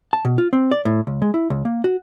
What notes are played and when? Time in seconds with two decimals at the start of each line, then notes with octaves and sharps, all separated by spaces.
0.13 A5
0.25 B2
0.38 F4
0.53 C4
0.71 D5
0.85 A2
1.07 C#2
1.22 G#3
1.34 E4
1.50 C#2
1.65 A#3
1.84 F#4